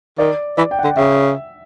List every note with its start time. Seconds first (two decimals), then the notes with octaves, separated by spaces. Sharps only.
0.18 D#3 D5
0.57 E3 D5
0.71 G5
0.79 F#5
0.84 D3 G5
0.97 C#3 E5